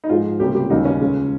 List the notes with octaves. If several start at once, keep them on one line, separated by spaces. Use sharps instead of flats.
D#4
G#2 F3 G#3 F4
C#2 C3 G3 A#3 G4
G4
D#2 C#3 G3 D#4
C#4
C#2 C#3 G#3